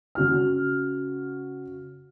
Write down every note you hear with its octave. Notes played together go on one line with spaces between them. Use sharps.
C#3 F#4 F6